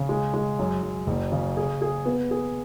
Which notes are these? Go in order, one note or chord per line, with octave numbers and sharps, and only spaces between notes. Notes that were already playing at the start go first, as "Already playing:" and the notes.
Already playing: C#3
G#3
G#3
F#2
F#2
F#1
C#3
G#4
G#4
B3
G#4